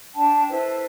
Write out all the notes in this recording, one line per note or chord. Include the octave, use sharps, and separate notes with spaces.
D4 G5 A5
E4 A4 B4 C5